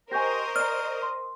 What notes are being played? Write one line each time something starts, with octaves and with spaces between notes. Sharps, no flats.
G4 A#4 C5 D#5 G#5 C#6 G6 A#6
D5 A#5 F6
C6